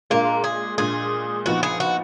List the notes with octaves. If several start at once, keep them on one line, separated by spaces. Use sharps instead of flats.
A#2 G#3 A#3 D4
G#4
A#2 G#3 D4 G#4
A#2 F3 B3 D#4 F#4
G#4
F#4